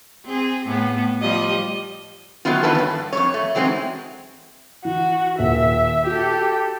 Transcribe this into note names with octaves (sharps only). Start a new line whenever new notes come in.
C4 G#4
A2 B3
F3 G3 D#5
D#3 F#3 A3 B3 F4
E2 D3 E3 B4 A5
G2 B2
F2 G#2 C#5
A3
E3 F#3 G#3 C4 D#4
E3 F#4
D#1 E5
F#4 G4 A4